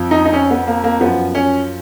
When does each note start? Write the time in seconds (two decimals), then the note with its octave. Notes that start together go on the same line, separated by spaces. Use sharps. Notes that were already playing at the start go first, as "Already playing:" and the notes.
Already playing: F2 F3
0.11 D#4
0.25 D#4
0.33 C#4
0.51 B3
0.67 A#3
0.84 A#3
1.01 F#2 F3 B3
1.35 C#4